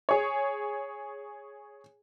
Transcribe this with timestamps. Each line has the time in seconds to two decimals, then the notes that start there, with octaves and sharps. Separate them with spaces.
0.09 G#4 C#5